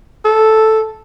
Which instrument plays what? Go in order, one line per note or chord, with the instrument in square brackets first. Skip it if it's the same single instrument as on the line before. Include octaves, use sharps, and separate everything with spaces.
[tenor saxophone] A4